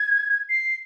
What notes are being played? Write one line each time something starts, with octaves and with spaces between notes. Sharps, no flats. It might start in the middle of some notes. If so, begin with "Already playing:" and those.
Already playing: G#6
C7